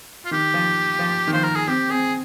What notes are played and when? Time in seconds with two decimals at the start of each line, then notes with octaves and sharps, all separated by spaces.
0.25 F4
0.31 D#3 G4
0.54 F3
0.99 F3
1.27 D#3
1.33 F3 C5
1.44 A#4
1.56 G#4
1.67 C4 G4
1.90 C4 G#4